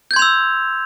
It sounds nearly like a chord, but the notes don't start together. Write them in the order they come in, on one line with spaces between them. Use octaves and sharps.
G6 G#6 C6 F7 E6